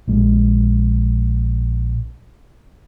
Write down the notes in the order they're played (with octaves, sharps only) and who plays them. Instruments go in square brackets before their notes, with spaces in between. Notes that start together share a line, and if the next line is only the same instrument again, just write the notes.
[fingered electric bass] A#1 G#3